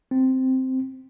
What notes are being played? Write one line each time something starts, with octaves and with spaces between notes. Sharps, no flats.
C4